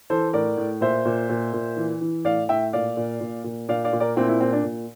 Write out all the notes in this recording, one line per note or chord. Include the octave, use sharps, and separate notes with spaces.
E3 A4 C5
A2 A#4 D5
A2
A#2 C5 E5
A#2
A#2
A#2
E3
E3
A2 D5 F5
A2 E5 G5
A#2 D5 F5
A#2
A#2
A#2
A#2 D5 F5
D5 F5
A#2
A#4 D5
A#2 C4 E4
C4 E4
A#2 C4
D4
A#2